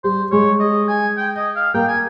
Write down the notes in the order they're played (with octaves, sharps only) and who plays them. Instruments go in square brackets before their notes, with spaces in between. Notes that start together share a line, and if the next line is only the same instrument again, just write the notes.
[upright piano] G3 [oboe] C5
[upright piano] G#3 [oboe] C#5
[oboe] D#5
G#5
G5
D#5
F5
[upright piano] A#3 [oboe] G5
[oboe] G#5